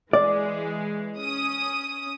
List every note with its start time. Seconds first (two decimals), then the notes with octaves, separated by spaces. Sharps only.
0.13 E3 G#3 D5
1.16 C#4 D#6